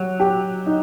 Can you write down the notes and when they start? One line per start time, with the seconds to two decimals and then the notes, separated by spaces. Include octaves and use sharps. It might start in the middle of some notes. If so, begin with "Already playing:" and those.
Already playing: F#3 G4
0.20 G4
0.66 D#4